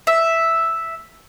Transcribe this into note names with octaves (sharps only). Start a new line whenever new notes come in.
E5